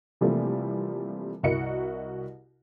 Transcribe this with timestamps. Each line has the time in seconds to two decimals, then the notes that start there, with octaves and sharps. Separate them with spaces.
0.21 C3 E3 F3 G3 A3 A#3
1.43 C2 E4 F#4 A#4 D#5 C#7